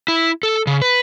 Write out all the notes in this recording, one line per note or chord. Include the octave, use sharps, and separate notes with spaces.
E4
A4
C#3
B4